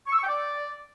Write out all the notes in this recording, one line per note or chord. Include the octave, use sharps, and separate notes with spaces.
C#6
E6
C#6
G5
D5